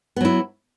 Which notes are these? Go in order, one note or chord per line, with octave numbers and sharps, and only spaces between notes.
F#3 B3 E4